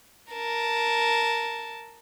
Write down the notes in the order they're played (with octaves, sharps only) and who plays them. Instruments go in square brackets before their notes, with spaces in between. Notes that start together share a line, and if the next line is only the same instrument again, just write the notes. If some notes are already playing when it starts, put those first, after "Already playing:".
[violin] A#4 A5